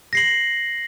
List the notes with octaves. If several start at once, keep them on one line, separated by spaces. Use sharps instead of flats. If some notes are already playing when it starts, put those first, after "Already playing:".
A#6 C7 F#7